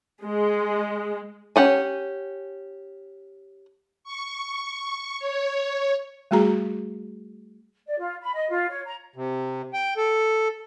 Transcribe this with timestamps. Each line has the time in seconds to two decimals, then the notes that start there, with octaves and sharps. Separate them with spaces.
0.25 G#3
1.56 C#4 G4 F#5 G#5
4.04 C#6
5.19 C#5
6.31 G3 A3 F#4 G#4 A#5
7.87 D5
7.98 F4
8.22 B5
8.34 D#5
8.49 F4
8.69 C#5
8.86 A#5
9.16 C3
9.73 G5
9.97 A4